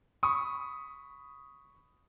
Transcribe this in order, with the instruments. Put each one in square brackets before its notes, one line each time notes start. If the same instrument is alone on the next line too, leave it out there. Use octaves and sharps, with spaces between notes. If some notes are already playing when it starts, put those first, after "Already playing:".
[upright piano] B5 C#6 D#6